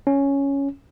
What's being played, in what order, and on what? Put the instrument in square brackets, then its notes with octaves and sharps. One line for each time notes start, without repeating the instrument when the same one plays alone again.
[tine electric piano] C#4